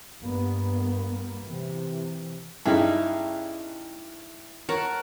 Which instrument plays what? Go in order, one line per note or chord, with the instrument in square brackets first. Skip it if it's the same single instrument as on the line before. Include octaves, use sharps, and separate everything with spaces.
[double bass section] G2 A#3 B3
C3 E3
[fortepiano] G2 C#3 D#4 [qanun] E4
[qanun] A#4 F#5 A5 [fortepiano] C#5